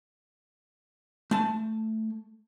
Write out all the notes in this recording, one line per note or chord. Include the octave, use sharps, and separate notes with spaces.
A3 A5